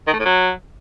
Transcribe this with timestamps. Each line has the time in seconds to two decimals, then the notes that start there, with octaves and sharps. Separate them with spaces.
0.07 D#3
0.13 A3
0.19 A2
0.25 F#3